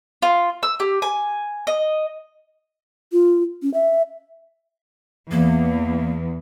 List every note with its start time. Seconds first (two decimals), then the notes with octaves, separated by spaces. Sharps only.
0.22 F4
0.63 E6
0.80 G4
1.02 G#5
1.67 D#5
3.12 F4
3.62 C#4
3.74 E5
5.31 E2 A#3